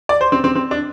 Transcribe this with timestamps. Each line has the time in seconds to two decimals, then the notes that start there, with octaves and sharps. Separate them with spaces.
0.09 D5
0.21 C5
0.32 C4
0.44 C4
0.55 C4
0.71 D4